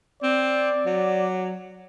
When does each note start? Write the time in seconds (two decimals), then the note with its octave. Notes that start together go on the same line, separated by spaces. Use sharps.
0.23 C4 D5
0.85 F#3